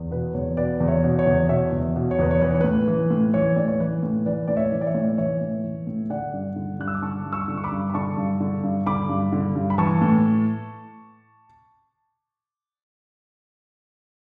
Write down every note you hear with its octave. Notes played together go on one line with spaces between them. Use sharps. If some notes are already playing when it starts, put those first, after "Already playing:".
Already playing: E2
B2 B4
E2 C#5
B2 B4 D5
E2
C#5 E5
B2
C#5
E2
B2 C#5 E5
E2
B2
C#5
E2 B4
C#5
E3 B4
C#5
A2 B4
E3
A2
E3 C#5
A2 D5
C#5
E3 B4
A2
E3 B4 D5
A2 D5
C#5 E5
E3
D5
C#5 E5
A2
E3 C#5 E5
A2
E3
A2
D3 D5 F#5
G2
D3
G2 F#6
E6
D6
D3 A5 C#6
G2
C#6 E6
D3
C#6
B5 D6
G2
B5
D3 A5 C#6
G2
D3
G2
D3 B5 D6
G2
D3
G2
B5
E3 A5 C#6
A2